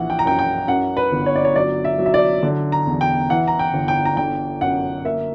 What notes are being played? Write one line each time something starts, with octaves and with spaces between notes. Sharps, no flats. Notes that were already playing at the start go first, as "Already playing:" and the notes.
Already playing: A#1 E3 F#5
G5
A#5
F#2 G5
G5
F#2 F#5
B4
G1
C#5
D5
C#5
F#3 D5
E5
F#3
E5
D5
D3
A#5
E2
G5
E3 F#5
A#5
G5
G1
G5
A#5
D3 G5
F#2 F#5
A#3 E5